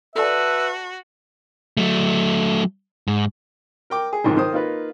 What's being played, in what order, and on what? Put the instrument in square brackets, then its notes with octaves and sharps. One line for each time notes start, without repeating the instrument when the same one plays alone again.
[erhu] F#4 [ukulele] A4 D5 A5 [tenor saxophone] B4 [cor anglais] E5
[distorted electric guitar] F#3 A3
G#2
[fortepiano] A#4 G5 D6
G#4
C#2 G#2 D#3
D#3 C5 D#6
A#3 D#4 F4 B4